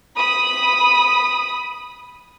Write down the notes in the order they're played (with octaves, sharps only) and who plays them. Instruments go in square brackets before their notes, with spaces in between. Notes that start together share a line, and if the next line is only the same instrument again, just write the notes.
[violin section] B5 D#6